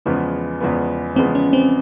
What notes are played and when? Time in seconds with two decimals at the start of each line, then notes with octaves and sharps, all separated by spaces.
0.06 E2 C#3 F3 G#3 B3
0.60 E2 C#3 F3 G#3 B3
1.16 E2 C#3 F3 G#3 B3 C4
1.35 C#4
1.53 C4